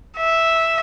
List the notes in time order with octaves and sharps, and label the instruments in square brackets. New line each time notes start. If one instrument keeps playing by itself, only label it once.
[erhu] E5